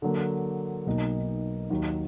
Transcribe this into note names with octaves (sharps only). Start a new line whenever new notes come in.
D3 F#3 A#3
B1 B2 A#3 D#4
D#2 D#3 F#3